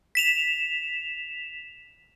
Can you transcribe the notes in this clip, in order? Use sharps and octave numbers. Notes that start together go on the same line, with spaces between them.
B6 E7 F7